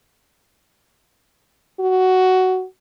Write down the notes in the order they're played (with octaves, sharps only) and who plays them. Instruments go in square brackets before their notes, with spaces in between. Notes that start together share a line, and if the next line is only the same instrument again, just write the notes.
[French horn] F#4